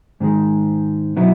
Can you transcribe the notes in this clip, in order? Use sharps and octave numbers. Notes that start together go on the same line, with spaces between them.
G#2 D#3 G#3
B2 F#3 B3 E4